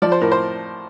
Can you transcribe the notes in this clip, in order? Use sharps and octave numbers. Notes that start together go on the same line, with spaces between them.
F3 D5
C5
A2 A#4
C5